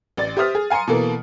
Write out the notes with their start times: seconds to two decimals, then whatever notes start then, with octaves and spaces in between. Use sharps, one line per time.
0.17 A1 D5 A6
0.37 G4 C5 E5 D#6 F6
0.55 G#4
0.70 F5 G#5 A#5 C6 C#7
0.87 B2 E3 A#3 A4 A#4